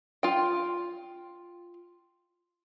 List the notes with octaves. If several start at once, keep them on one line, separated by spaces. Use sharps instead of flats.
F4 G5